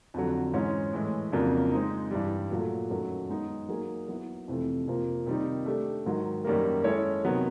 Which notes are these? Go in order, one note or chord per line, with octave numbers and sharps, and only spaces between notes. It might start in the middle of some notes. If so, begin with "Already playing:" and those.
F2 D3 F#3
G#2 E3 G#3 C#4
A2 E3 G#3
F2 C#3 F#3 A#3 D4
G#3 C4 D#4
G2 E3 G3
A#2 F#3 A3
F#2 D#3 F#3 A3
G#3 B3 D#4
F#3 A#3 D#4 G#4
F#3 B3 E4
F2 C3 E3 A3
F2 C3 F3 A#3
C3 D#3 G3 A#3 D#4
A3 D4 G4
G#2 D#3 F#3
F#2 D#3 G3 A#3
G#3 C#4 E4 A4 C#5
C3 D#3 F#3 B3